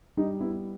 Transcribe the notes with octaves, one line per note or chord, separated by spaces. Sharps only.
G3 D#4
B3 E4